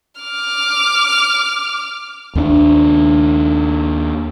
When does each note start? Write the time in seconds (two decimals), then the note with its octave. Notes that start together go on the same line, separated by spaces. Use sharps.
0.21 D6 F6
2.35 D#2 C4 D4